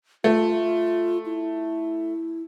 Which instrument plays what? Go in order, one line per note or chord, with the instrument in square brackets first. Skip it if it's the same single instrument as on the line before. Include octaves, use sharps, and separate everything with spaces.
[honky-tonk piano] A3 [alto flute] F4
[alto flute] E4